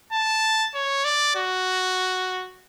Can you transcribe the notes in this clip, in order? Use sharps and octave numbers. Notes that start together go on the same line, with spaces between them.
A5
C#5
D5
F#4